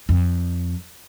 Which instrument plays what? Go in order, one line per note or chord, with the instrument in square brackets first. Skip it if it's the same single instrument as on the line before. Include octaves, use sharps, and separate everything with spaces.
[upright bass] F2